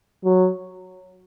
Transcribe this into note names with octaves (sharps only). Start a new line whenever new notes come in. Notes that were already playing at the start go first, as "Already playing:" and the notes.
F#3